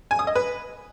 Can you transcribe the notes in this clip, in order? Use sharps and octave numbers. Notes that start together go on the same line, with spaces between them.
G#5
D#6
D#5
B4